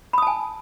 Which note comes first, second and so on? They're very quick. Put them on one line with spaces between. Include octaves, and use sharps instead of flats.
B5 D#6 A5 G#5